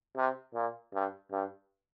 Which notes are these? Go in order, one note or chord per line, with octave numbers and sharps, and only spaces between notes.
C3
A#2
G2
G2